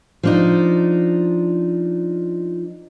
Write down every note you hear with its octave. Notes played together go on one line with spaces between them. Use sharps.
F3 D4 D#4